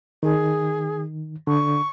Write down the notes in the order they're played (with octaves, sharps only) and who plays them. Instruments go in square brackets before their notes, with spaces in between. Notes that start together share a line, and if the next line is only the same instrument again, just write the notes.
[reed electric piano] D#3 [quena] G#4
[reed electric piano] D3 [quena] C#6